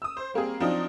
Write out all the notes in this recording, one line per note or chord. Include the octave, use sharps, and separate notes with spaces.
D#6 E6
C5
G3 A#3 C4 G#4
F3 F#3 C4 D4 D#4